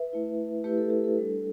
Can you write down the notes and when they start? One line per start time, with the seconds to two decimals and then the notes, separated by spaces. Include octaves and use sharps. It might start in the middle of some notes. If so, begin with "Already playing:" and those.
Already playing: B4 E5
0.13 A3 E4
0.64 A3 E4 G4 B4
0.78 A4
0.90 G4
1.04 A4
1.17 G3 D4